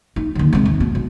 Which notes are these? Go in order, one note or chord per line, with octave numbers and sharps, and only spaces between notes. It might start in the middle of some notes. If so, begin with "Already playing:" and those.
D#4
D#2 D3
G#2 C3
D#2
B2
B2